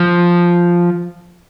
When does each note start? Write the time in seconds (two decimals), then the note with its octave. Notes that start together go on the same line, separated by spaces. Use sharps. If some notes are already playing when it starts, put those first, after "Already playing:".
Already playing: F3